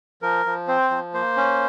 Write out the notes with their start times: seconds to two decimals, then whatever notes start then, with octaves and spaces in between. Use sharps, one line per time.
0.22 F3 A#4
0.46 F3
0.68 C4 C5
0.91 F3
1.14 A#3 C5
1.37 C#4